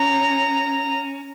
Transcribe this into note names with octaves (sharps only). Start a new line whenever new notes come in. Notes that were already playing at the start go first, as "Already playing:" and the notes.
Already playing: C#4 A#5